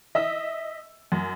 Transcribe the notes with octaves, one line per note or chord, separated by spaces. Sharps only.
D#5 E5 E6
F#2